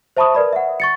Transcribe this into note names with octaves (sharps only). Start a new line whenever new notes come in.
C5 E5 A5 B5 C#6 D#6
A#4 B4 D5 B5
E5 F#5
C#6 A6 C#7